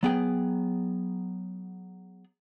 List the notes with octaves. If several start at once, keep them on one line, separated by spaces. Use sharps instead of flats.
F#3 B3 G#4 G5